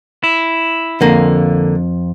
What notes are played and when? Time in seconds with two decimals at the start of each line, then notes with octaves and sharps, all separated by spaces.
0.24 E4
1.01 F2 D3 A#3